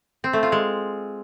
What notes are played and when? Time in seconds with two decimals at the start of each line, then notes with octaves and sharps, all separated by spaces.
0.24 C4
0.33 A3
0.43 F4
0.52 G#3